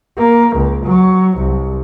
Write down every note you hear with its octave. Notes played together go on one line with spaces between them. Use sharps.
A#3
C#2
F#3
C2